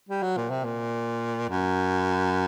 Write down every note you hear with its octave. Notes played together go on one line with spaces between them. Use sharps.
G3
F#3
A#2
C3
A#2
F#2